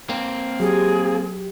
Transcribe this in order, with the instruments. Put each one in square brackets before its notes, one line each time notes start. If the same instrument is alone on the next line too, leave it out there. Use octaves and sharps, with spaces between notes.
[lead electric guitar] A#3 C4
[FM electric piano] F#3 G4 [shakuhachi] G#4